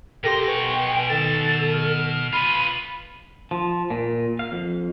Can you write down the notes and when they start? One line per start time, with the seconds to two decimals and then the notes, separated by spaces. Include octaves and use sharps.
0.24 B2 G4 A4 A#4 G5 C6 A#6
0.48 B4 G#5 C#6
0.94 D7
1.09 D#3 A4 A6 E7
1.72 F6
2.33 F4 B4 B5 D#7
3.51 F3
3.90 A#2
4.39 F5
4.52 F2